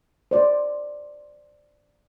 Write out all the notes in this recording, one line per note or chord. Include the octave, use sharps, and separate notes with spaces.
C5 D5